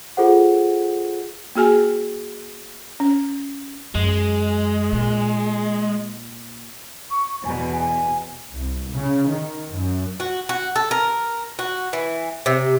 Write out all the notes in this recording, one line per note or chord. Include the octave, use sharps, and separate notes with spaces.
F4 G#4 A4 C5 F#5
A#3 F#4 G#4 G#5
C#4
F#2 G#3
A#2
C#6
E2 B2 G#5
G#5
C2
C#3
D#3
F#2
F#4
F#4
A4
A#4
F#4
E3
C3